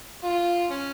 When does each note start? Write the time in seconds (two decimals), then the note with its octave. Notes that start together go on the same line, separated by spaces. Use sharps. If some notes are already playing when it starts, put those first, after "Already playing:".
0.24 F4
0.71 C#4